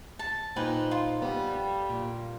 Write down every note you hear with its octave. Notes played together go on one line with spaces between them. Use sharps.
A5
A#2 D#4 B4 C5 G5 G#5
F4
G3 B3
F2
A#2